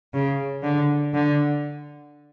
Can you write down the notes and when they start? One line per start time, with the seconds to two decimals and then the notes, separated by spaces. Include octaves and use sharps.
0.14 C#3
0.63 D3
1.14 D3